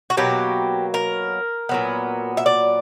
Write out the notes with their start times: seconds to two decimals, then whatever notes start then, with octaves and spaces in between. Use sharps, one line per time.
0.10 F#4
0.17 B2 F#3 A#3 G4
0.94 A#4
1.69 A#2 F#3 B3
2.37 E5
2.46 D5